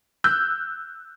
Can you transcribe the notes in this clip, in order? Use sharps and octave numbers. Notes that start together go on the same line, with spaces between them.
E6 F#6 G6